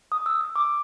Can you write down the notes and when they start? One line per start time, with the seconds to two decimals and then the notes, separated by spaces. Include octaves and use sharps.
0.12 D#6
0.26 E6
0.41 E6
0.56 D6